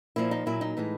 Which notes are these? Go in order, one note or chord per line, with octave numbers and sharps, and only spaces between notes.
A#2 F3 A#3 E4
D#4
A#2 F#3 A#3 E4
D#4
A2 E3 G#3